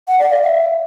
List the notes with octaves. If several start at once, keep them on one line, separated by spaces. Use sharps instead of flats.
F#5
D5
F5
E5